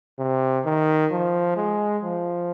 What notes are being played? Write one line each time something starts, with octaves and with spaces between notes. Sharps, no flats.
C3
D#3
F3
G#3
F3